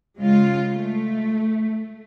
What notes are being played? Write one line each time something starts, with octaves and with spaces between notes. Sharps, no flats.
C#3 G#3 F4
A3